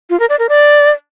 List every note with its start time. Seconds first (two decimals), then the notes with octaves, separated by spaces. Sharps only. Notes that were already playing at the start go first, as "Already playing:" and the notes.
0.10 F4
0.20 A#4
0.29 D5
0.39 A#4
0.49 D5